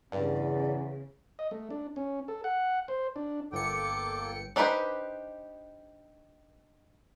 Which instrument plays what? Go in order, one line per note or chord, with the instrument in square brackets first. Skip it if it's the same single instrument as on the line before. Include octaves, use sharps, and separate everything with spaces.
[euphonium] E2 [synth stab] G2 [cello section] C#3 [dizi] D5
[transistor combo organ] D#5
A3
D4
C#4
A4
F#5
C5
D4
[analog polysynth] G1 C#7 [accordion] A#3 A4 [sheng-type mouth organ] G5 [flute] D6
[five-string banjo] D4 D#4 G4 B4 C5